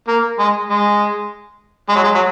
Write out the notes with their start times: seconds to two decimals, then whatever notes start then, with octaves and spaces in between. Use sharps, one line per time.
0.08 A#3
0.39 G#3
0.69 G#3
1.89 G#3
1.96 F#3
2.04 G#3
2.15 F#3